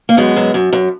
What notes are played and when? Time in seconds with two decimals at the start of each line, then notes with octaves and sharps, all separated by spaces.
0.09 A#3
0.17 F#2 G#3 B3
0.36 F#2
0.54 F#2
0.73 F#2